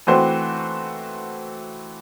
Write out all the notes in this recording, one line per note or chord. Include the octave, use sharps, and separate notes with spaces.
E3 A3 C4 F#4 C5